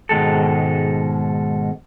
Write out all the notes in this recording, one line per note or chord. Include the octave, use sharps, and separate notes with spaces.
G#2 B2 D#3 G#3 A4